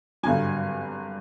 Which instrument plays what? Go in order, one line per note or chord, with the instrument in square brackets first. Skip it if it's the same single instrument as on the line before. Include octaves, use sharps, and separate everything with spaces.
[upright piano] G#1 G2 D3 F#3 G#5